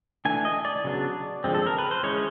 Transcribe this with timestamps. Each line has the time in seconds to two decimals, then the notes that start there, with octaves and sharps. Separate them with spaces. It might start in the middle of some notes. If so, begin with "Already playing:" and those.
0.25 E3 A3 D4 G#5
0.45 D#5
0.65 D5
0.84 C#3 F#3 B3 D4
1.44 D3 F3 G#3 C4
1.55 A4
1.66 A#4
1.78 B4
1.91 C5
2.03 E3 G#3 C#4 C#5